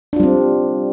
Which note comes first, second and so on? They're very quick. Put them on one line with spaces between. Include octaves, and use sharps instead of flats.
D4 F4 G3 C4